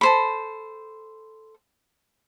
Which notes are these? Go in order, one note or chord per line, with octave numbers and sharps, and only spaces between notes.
A4 C5 B5